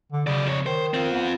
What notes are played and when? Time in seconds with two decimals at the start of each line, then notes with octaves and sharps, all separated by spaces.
0.13 D3
0.27 C#3 F#3 D5
0.46 F2 C#5
0.66 D#3 C5
0.94 C4 F4
1.11 B3